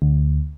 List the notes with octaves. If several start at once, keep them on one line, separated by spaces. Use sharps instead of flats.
D2